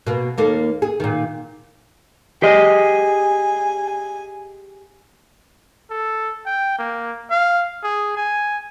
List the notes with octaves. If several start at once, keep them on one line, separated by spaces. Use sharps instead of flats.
B2 A#3
D#2 A#3 A4
G#4
A#2 D#3
G4 G#4 D#5 G#5
A4
G5
A#3
F5
G#4
G#5